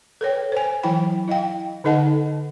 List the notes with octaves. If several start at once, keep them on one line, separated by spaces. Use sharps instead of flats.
A4 B4 C#5 G5
C5 G#5
E3 F#3 E4 G5 B5
E4 D#5 F5 G5
D3 D#4 A4 D#5 F#5 A5